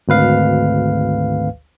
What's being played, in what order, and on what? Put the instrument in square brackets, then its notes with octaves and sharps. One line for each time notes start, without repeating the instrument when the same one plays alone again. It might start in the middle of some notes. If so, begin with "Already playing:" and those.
[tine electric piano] G#1 D2 B4 F5